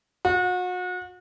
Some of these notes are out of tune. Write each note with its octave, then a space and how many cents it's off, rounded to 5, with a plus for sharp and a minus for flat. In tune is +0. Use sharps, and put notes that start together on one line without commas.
F#4 -35